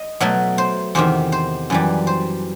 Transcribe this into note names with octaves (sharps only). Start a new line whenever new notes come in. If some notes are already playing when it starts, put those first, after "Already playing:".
Already playing: D#5
B2 F#3 A3
C5
E2 C3 D#3 C5
C5
F#2 E3 G3
C5